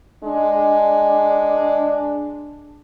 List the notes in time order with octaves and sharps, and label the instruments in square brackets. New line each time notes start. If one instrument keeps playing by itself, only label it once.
[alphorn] G#3 [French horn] D4